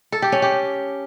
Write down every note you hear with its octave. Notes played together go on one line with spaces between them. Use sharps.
A4
G4
C#4
G4